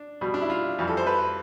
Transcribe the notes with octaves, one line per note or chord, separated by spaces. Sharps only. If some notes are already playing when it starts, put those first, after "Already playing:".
Already playing: D4
B2 G3
D4
E4
F4
F2 E3 G3
A4
C5
B4